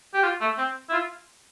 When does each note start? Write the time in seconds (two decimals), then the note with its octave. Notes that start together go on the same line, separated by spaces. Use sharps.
0.14 G4
0.24 F4
0.41 A3
0.58 C4
0.89 E4
0.92 F4